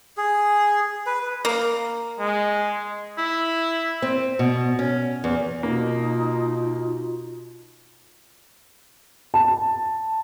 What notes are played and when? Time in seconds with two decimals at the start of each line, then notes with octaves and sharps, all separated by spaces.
0.17 G#4
1.06 B4
1.45 A#3
2.20 G#3
3.18 E4
4.02 C4
4.39 B2
4.79 C#4
5.24 E2
5.63 B2 A#3 D#4 F4
9.34 A5